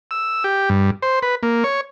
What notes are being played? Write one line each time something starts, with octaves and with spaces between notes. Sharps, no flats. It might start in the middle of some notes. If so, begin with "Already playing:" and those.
E6
G4
G2
C5
B4
A#3
C#5